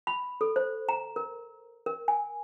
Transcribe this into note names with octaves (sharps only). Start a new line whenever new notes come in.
B5
A4
C5
A#5
A#4
A#4
G#5